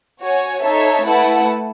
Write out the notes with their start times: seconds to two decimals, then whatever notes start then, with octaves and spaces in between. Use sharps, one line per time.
0.22 F#4 C#5 G#5
0.63 D#4 A4 C#5 E5 A5
1.05 A3 E4 B4 F#5 A5